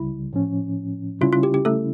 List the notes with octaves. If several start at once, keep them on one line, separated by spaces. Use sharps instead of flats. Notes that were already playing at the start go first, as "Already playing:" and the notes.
Already playing: C#2 C#3 G3 E4
A2 F3 C#4
C#3 G3 C#4 E4 F4
F4
G4
G4
A3 A4